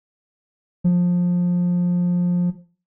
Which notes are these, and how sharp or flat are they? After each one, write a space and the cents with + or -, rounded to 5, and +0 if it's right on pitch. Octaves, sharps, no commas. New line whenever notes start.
F3 +20